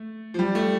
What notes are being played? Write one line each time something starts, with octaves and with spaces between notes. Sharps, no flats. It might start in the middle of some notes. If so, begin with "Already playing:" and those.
Already playing: A3
F3
G3
A3